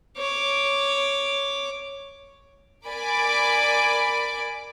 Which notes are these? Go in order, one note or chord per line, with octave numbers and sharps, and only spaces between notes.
C#5 D6
A#4 D5 G#5 B5 D6